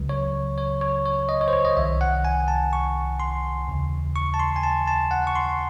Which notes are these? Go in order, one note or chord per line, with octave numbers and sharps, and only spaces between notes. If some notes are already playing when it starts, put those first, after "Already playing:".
Already playing: C#2 C#3 F#3
C#5
C#5
C#5
C#5
D#5
C#5
C5
C#5
D#5
C2 C3 D#3 E5
F#5
G#5
A5
C#6
C6
D#2 C#3 E3
C#6
A5
C6
G#5
A5
A5
F#5
C#6
C6